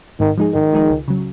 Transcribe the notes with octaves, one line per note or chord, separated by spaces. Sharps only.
G#2 D#3
F3 G#3 D#4 G#4
G#2 D#3
F3 G#3 D#4 G#4
C#2
C#3 F#3